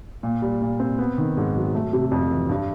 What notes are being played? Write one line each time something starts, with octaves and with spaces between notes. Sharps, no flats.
A#2
G3
A#2
C4
B3
D#3
G#2
F#3
A3
C3
F2
E3
G2